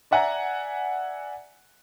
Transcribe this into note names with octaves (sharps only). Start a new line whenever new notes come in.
D5 E5 F#5 G#5 A#5